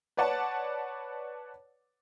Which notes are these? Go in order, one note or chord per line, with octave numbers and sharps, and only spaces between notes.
B4 C#5 D5 F#5 A5